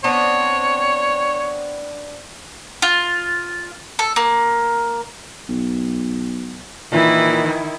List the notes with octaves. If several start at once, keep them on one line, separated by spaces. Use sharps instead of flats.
B3 C4 D4 C#5
F4
A4
A#3
B1
A#2 D#3 E3 E4